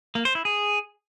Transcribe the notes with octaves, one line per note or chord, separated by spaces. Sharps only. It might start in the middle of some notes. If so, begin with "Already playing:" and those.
A#3
C5
E4
G#4